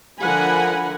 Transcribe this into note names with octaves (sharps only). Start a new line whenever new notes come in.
D3 F3 A#4 F#5 G#5 B5